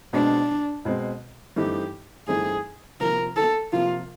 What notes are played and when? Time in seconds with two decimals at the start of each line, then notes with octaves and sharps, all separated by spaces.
0.13 B2 G#3 C4 D4
0.85 B2 G#3 C4
1.56 G2 E3 A3 C4 D#4 G4
2.28 G2 E3 A3 C4 D#4 G#4
3.00 C3 F3 A#3 A#4
3.36 A4
3.72 C3 F3 A#3 F4